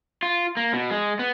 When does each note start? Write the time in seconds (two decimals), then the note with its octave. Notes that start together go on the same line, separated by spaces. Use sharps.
0.23 F4
0.57 A#3
0.73 B2
0.91 G#3
1.19 B3